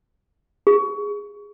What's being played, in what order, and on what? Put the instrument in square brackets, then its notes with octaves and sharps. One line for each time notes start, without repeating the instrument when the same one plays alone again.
[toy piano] G#4